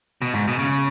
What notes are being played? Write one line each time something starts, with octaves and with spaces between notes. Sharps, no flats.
B2
G#2
B2
C#3